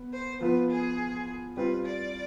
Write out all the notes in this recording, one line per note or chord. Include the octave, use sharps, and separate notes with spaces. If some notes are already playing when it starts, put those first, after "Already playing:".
Already playing: B3
C5
F3 B3 F4 B4
G#4
G3 C4 F4 B4
D5